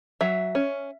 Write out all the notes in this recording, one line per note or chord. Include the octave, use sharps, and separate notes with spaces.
F#3 E5
C#4